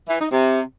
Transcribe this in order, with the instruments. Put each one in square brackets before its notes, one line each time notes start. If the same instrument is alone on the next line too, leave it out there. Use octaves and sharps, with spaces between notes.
[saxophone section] E3
D#4
C3